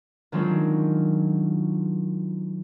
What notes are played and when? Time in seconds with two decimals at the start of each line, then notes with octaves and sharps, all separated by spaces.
0.32 D#3 F#3 G#3 C4 D4 F4